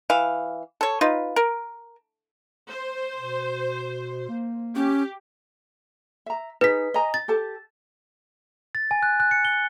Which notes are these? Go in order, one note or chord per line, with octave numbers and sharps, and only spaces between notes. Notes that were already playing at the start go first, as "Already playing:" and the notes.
E3 F5
A4 C#5
D#4 F4 B4
A#4
C5
B2
A#3
C#4 G4
E5 A#5
D#4 G#4 B4 B6
D#5 G#5 A#5
A6
G4 A4 A5
A6
G#5
F#6
F#6
C#7
G7